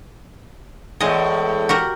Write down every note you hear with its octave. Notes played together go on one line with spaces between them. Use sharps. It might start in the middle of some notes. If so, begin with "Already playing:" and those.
E2 A2 G#3 D#5
F#4 G4 A#4